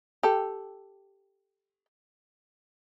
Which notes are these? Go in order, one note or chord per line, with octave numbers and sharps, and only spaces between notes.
G4 A4